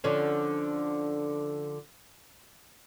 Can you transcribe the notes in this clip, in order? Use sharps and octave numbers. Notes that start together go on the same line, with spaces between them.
D3 F3 C#4